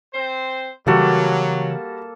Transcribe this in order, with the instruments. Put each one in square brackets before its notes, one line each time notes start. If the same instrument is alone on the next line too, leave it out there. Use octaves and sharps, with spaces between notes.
[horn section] C4 C5
[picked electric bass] C#3 E3 [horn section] F#3 [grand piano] G3 F#4 [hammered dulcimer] A#3 A4